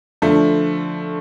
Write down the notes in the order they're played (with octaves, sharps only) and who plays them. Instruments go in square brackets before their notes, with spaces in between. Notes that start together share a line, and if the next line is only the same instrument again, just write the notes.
[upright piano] D3 F3 A3